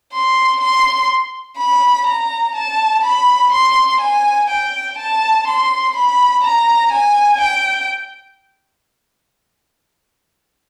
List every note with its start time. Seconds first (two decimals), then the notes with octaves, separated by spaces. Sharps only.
0.13 C6
0.61 C6
1.58 B5
2.07 A#5
2.56 A5
3.04 B5
3.53 C6
4.01 G#5
4.50 G5
4.99 A5
5.47 C6
5.96 B5
6.44 A#5
6.92 G#5
7.41 G5